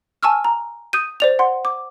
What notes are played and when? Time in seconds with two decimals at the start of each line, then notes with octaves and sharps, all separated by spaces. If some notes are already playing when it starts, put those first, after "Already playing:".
0.23 G#5 A5 C#6 E6 F6
0.44 A#5
0.93 D#6 G6 D#7
1.20 C5 D5 F7
1.39 F#5 C6
1.65 D6